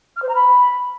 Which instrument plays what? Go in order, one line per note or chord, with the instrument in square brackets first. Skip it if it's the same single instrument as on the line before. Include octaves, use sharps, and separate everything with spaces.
[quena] F6
C5
A#5
B5